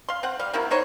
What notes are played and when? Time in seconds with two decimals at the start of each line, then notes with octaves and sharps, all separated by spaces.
0.09 F5 C6
0.23 C4 F#5
0.39 G3 F5
0.53 C3 A#3 E4 F#4
0.70 B3 D#4 C5 C#5